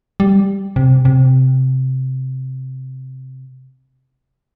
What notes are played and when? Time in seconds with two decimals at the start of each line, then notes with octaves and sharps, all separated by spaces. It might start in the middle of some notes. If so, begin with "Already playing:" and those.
0.20 G3
0.76 C3
1.05 C3